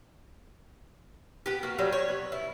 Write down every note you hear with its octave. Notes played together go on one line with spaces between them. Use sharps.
B3 G4
A#3 F#4
F#3 G3
C#5
B3
E4